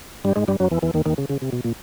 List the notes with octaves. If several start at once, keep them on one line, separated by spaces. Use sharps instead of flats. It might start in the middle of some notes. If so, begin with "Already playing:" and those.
G2 G3
G#2 G#3
G2 G3
F#2 F#3
E2 E3
E2 E3
D#2 D#3
D#2 D#3
C#3
C#3
C3
B2
A#2